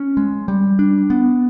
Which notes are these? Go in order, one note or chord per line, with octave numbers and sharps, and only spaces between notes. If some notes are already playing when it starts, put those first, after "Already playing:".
Already playing: C#4
G#3
G3
D4
B3